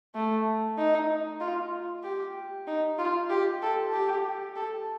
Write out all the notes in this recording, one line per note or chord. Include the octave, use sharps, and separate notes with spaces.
A3
D#4
F4
G4
D#4
F4
G4
A4
G4
A4